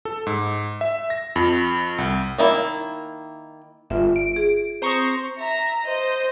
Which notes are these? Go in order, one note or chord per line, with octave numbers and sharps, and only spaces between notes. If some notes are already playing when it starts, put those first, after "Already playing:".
A4
G#2
E5
A#6
F2
C2
D#3 A#3 E4
G1 F4 E5
D7
G#4
C4 C5 A#5 C#6 D#6
E5 A#5
C5 D#5